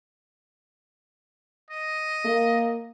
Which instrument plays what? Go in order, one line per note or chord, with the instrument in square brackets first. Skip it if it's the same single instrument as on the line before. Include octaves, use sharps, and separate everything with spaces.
[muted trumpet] D#5
[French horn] A#3